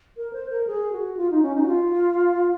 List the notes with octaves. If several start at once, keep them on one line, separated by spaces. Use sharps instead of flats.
A#4
C5
A#4
G#4
F#4
F4
D#4
C#4
D#4
F#4
F4